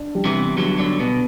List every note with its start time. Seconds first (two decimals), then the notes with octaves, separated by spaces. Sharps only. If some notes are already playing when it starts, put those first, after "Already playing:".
Already playing: D4
0.15 G3
0.25 C3 E3
0.36 B3
0.57 D3 F#3 G3
0.78 D3 F#3 D4
1.00 B2 B3